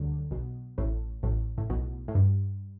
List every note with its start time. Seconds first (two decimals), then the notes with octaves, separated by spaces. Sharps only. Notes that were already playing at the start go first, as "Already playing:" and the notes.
Already playing: D2 D3 F#3 G3
0.31 B1 B2
0.78 A1 A2
1.23 A1 A2
1.58 A2
1.70 B1 B2
2.08 A2
2.15 G2